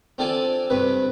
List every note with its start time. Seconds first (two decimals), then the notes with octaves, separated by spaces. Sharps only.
0.18 C4 D4 F4 A4 D5 G#5
0.70 G2 C3 B4